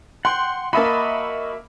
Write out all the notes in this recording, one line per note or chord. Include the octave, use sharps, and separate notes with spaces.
F#5 G5 C6
A#3 F#4 D#5 E5 A5 B5